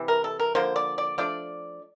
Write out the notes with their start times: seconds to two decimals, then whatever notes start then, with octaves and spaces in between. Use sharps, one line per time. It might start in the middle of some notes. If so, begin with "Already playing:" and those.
Already playing: C3 E3
0.08 A#4
0.24 A4
0.40 A#4
0.55 D3 F3 A#3 C5
0.76 D5
0.98 D5
1.18 F3 A3 D4 D5